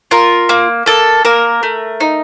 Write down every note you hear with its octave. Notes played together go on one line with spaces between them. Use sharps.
F4 A#4
A#3
A#3 A4
A#3 A#4
A3
D#4